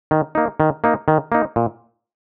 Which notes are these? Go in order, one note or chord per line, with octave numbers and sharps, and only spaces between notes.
D#3
A#3 D#4
D#3
A#3 D#4
D#3
A#3 D#4
A#2